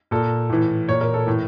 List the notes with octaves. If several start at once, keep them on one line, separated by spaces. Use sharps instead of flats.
A#2 A4
A2 E3
A#2 C#5
A#4
A4
A2 E3